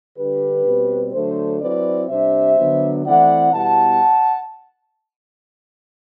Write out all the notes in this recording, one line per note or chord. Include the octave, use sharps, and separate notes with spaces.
D3 G3 D4 G4 B4
B2 G3 C4
D3 F#3 A3 D4 A4 C5
F#3 C4 E4 B4 D5
C3 G3 D4 C5 E5
D3 F#3 B3 D4
E3 A3 C4 E4 D5 F#5
B2 G3 B3 E4 F#5 A5